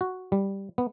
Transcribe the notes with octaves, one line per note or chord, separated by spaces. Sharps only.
F#4
G3
B3